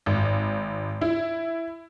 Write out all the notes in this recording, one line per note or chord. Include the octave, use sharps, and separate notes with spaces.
G#1
E4